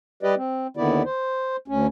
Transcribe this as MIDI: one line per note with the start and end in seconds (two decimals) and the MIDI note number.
0.23 0.35 55
0.23 0.35 67
0.23 0.35 71
0.23 0.35 74
0.23 0.35 75
0.37 0.67 60
0.77 1.03 39
0.77 1.03 50
0.77 1.03 51
0.77 1.03 59
0.77 1.03 64
0.77 1.03 74
1.05 1.56 72
1.68 1.87 38
1.68 1.87 61